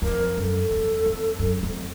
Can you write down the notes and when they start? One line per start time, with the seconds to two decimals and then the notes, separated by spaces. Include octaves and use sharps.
0.02 F2 A#4
0.37 F#2 A4
0.71 E2
1.06 F2
1.39 F#2
1.63 F2